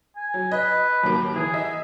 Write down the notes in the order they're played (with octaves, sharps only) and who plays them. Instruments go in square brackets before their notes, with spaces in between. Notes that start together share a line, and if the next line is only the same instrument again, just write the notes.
[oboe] G#5
[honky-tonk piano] F#3
[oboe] B4 [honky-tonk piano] D#5
[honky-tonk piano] D#2 F#3 A#3
[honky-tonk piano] E3 [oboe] G#4
[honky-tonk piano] D#5 E5